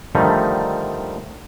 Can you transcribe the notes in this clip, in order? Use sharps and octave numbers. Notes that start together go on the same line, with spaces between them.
D3 D#3 F3 G3 A3 D#4